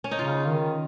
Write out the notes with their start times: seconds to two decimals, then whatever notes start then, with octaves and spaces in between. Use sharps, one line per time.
0.04 C#4
0.11 D#4
0.19 C#3 F4
0.46 D#3